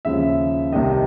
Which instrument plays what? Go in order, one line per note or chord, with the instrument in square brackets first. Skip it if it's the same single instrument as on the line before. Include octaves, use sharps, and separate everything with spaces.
[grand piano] D#2 C#3 F3 E5
C2 C3 D#3 D#5